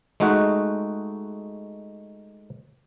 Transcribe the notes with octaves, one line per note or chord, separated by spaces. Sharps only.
G#3 A3 D#4 F#4 F#5